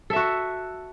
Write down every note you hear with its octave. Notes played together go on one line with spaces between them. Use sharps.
F#4 A4 E5